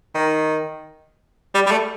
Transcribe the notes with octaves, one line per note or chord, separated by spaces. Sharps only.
D#3
G3
G3
A3